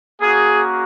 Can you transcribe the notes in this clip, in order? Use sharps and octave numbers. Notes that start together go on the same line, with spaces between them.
A#3 C#4 F#4 G#4